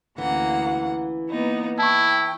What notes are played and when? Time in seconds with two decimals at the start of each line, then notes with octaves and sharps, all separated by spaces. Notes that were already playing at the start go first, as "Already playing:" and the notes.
0.18 D2 E3 A#3 C#4 F#5
1.29 A#3 B3 D#4
1.79 E4 G5 A5 C#6